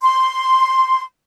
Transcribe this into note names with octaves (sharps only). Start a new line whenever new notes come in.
C6